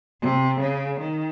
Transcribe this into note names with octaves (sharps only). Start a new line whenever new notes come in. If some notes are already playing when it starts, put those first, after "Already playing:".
C3
C#3
D#3